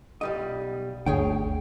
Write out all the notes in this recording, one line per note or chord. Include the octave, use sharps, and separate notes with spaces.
B1 G3 D#5
G1 D2 G#4 C#5 G5